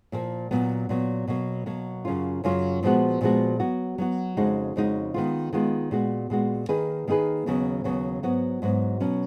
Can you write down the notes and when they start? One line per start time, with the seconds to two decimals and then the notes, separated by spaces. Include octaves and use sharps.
0.12 A#2 F3 A#3
0.51 A#2 F#3 B3
0.89 A#2 F#3 B3
1.28 B2 F#3 A#3
1.66 B2 F#3 A#3
2.05 F#2 C#3 F#3 C#4 F4
2.44 F#2 C#3 F#3 C#4 F4
2.83 A#2 F3 G#3 B3 F#4
3.21 A#2 F3 G#3 B3 F#4
3.59 F#3 B3 F#4
3.98 F#3 B3 F#4
4.37 F2 C#3 G#3 D#4 F#4
4.76 F2 C#3 G#3 D#4 F#4
5.14 D#3 G#3 B3 F4
5.53 D#3 G#3 B3 F4
5.91 A#2 G#3 B3 F#4
6.30 A#2 G#3 B3 F#4
6.69 D#3 A#3 D#4 G#4 B4
7.08 D#3 A#3 D#4 G#4 B4
7.46 D#2 C#3 F#3 B3
7.84 D#2 C#3 F#3 B3
8.23 G#2 F#3 B3 F#4
8.62 G#2 F#3 B3 F#4
9.00 B2 F#3 C#4